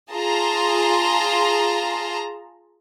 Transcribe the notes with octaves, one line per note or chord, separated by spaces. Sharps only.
F4 G#4 A5 A#5 C6